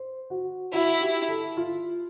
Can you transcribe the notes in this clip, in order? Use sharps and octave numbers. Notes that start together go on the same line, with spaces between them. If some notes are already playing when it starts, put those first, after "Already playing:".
Already playing: C5
F#4
E4 F#4
G4
A4
F4